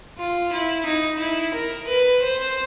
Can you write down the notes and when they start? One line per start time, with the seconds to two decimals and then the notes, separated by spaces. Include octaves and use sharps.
0.18 F4
0.52 E4
0.85 D#4
1.19 E4
1.54 A#4
1.87 B4
2.22 C5